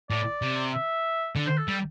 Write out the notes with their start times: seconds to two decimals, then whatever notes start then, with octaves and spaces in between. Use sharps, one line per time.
0.10 A2 D5
0.42 C3
0.73 E5
1.36 D3
1.46 C5
1.57 A4
1.68 G3